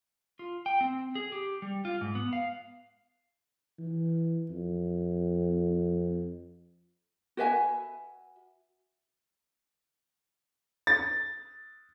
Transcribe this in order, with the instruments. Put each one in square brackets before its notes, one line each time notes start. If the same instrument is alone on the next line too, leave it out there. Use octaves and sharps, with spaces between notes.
[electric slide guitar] F4
G5
C4
G#4
G4
G3
F4
G#2
B3
F5
[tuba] E3
F2
[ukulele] F#4 B4 E5 G#5
[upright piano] A6